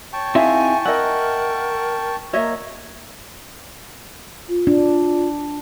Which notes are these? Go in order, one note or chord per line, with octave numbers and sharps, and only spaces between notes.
C#5 G5 A5 C#6
C4 D#4 E4 G#4 E5 F5 G#5
A#4 D#5 E5 F#5
A#3 C#5 D#5 E5
F4
D4